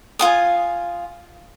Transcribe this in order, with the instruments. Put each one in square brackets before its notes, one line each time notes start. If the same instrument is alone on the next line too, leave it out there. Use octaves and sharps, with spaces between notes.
[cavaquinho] F4 G#5 D#6